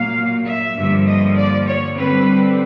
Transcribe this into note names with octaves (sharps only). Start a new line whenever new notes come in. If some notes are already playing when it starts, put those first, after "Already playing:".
Already playing: A#2 F#3 A#3 F5
E5
G2 D3 F3 A#3
D#5
D5
C#5
D3 G3 C4 B4